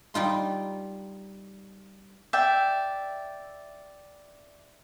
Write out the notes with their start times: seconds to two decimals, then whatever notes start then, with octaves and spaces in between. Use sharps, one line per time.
0.14 G3 D#4 F4 C6
2.33 D5 E5 G5